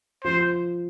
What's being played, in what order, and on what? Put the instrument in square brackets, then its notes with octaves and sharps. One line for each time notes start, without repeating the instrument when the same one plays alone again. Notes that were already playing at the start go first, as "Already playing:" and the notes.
[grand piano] F3 [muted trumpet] C5